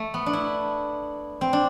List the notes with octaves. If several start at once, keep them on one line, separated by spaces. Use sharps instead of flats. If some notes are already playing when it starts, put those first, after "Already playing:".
Already playing: A3
B3
D4
E4
C4
D4